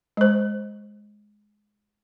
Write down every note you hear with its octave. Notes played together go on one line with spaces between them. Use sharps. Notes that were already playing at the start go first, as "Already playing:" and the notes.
G#3 C5